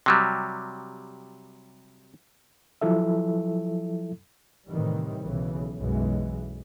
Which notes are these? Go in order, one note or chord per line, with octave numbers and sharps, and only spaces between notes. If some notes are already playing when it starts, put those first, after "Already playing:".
C3 F#3 G3
F3 F#3 E4 A4 E5
A2 C3 D#3 E3 G3
B1 C#3 E3
B1 F#2 E3 G#3